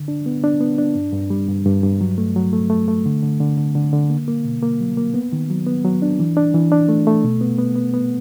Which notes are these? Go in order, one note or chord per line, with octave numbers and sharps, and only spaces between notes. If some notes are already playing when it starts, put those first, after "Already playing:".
Already playing: D3
D4
B3
D4
B3
D4
G2
G2
G3
G2
G2
G2
F#3
A3
F#3
A3
A3
A3
D3
D3
D3
D3
D3
D3
A#3
A#3
B2
A#3
F#3
A#3
B3
D#3
F#3
B3
F#3
D4
E3
D4
E3
D4
A3
A3
B2
B3
B3
B3
B3